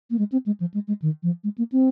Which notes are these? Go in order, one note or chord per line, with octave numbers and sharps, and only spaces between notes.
A#3
G#3
C4
G#3
F3
G#3
G#3
D#3
F3
G#3
A#3
C4